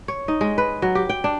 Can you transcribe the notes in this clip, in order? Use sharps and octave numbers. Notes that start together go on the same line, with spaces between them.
C#5
D#4
G#3
B4
F#3
G4
G5
D4